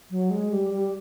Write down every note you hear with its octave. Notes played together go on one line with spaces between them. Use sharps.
F#3
G#3
G3
G3